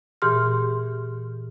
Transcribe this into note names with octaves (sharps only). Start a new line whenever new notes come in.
A#2 E3 G4 G#4 C6 F6